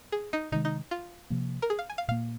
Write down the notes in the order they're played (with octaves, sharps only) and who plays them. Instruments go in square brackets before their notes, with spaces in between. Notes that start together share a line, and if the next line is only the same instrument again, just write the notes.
[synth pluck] G#4
D#4
[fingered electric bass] C3 D#3 G#3 [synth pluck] D#4
[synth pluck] D#4
F4
[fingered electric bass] C3 F3 A#3
[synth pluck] A#4
G#4
F5
G#5
F5
[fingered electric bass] A#2 A#3 [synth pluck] F5